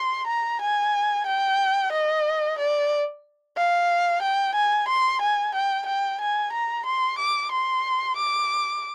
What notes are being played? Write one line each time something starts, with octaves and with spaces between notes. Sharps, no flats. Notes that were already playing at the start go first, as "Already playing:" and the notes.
Already playing: C6
A#5
G#5
G5
D#5
D5
F5
G5
G#5
C6
G#5
G5
G5
G#5
A#5
C6
D6
C6
D6